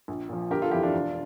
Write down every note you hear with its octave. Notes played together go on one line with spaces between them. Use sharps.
A#1
A#2 F3
G1 G4 A#4
F4 A4
F2 E3 E4 G4
D4 F4
E1